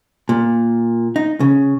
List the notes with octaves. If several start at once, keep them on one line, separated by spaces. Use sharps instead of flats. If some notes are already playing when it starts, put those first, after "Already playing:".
A#2
D#4
C#3